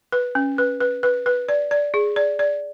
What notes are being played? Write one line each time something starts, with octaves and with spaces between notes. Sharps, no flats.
B4
C#4
B4
B4
B4
B4
D5
D5
G#4
D5
D5